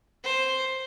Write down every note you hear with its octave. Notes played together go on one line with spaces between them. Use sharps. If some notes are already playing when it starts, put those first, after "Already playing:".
C5